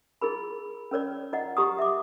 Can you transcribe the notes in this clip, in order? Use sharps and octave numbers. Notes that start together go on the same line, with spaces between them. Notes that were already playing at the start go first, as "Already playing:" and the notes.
E4 G#4 A#4 B5
C#4 A#4 C#5 D5
E4 D5 D#5 F#5
G4 A#5 C#6 D#6
E5 D6